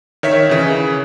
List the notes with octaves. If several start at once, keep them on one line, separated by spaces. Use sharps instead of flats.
D#3 C#5 E5 B6
C#3 E3